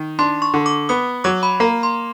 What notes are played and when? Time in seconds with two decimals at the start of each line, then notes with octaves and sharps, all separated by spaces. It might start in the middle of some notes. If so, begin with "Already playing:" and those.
Already playing: D#3
0.19 D4 C6
0.42 C#6
0.54 D3
0.66 D6
0.89 B3 D#6
1.24 F#3 D6
1.43 B5
1.60 A#3 A#5
1.83 C6